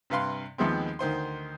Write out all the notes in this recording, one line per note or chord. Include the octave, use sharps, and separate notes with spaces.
G2 C3 B4 F5 C6
D#2 F3 G#3 B3 C4
D2 D#3 C5 C6